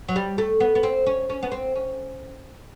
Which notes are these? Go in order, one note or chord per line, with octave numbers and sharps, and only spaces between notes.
F#3
G3
A3
B3
B3
C4
C#4
C#4
B3
C4
C#4